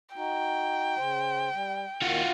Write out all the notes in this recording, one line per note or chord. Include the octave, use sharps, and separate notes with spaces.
D#4 F#4 G5
C#3 C5
G3
D#2 D#3 F4 F#4